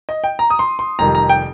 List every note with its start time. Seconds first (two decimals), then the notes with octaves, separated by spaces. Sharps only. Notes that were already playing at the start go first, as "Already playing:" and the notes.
0.09 D#5
0.24 G5
0.39 A#5
0.50 D#6
0.59 C6
0.79 C6
0.99 F1 F2 D#3 G3 A#5
1.15 A#5
1.30 G5